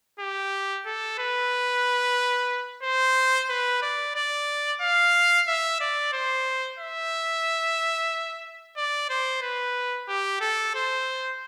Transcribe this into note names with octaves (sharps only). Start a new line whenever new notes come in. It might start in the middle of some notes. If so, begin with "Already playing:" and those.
G4
A4
B4
C5
B4
D5
D5
F5
E5
D5
C5
E5
D5
C5
B4
G4
A4
C5